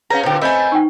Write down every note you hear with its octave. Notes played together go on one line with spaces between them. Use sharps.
C#4 G#4 B4 C#5 F5 A#5
A#2 D3 D#4 G4 C5
A3 C4 D#5 E5 G#5 B5 G6
D#4 G5 C#6